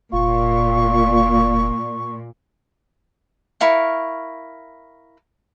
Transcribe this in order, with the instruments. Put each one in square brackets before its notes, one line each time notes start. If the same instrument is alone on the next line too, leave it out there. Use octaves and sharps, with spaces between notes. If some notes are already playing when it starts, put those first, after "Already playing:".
[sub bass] F1 [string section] A#2 [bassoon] F4 [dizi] C#6
[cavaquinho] E4 A#4 F5 C#6